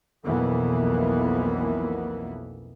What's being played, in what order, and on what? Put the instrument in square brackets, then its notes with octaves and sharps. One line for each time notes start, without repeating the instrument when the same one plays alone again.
[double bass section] B1 F2 E3 A#3 B3